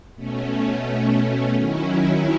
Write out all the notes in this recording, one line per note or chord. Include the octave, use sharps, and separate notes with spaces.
B2 A3 C#4
D#3 F#3 C#4 E4